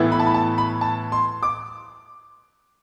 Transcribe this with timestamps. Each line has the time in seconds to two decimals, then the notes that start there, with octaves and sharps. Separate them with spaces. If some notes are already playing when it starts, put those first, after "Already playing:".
Already playing: A2 E3 B3 E4
0.12 B5
0.20 A5
0.26 B5
0.34 A5
0.58 B5
0.81 A5
1.12 C6
1.43 D6